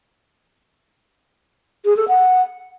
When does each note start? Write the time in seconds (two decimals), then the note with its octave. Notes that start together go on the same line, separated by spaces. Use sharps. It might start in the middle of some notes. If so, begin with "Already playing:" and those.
1.85 G#4
1.97 A4
2.08 F#5